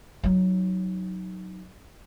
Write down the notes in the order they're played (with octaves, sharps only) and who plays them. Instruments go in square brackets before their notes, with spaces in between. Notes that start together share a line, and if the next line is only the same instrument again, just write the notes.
[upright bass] F#3 D#4